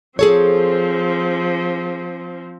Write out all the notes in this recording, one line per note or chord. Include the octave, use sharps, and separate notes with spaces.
F3 C4 G#4 A4 C#5